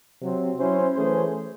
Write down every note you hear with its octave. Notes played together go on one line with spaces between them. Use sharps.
C3 F#3 C4
F#3 C#4 E4 C5
E3 A3 C#4 G#4 C5